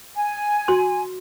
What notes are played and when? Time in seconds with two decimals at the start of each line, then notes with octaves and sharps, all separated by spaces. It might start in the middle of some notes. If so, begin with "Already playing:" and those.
0.15 G#5
0.68 F#4 C6